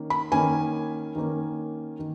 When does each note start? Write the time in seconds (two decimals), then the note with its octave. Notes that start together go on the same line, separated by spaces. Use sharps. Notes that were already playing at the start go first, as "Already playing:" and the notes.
Already playing: D#3 A#3 C#4
0.10 B5
0.32 D#3 A#3 C#4 G#5
1.15 D#3 A#3 C#4
1.99 D#3